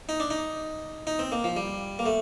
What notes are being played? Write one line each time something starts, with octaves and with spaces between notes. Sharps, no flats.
D#4
D4
D#4
D#4
C4
A#3
F3
G3
A#3
A3